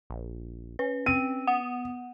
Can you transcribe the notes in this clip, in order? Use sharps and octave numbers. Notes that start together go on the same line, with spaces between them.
A#1
C#4 B4
C4 D#7
B3 F#5